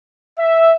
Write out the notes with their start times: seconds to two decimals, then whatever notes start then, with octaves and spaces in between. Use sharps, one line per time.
0.38 E5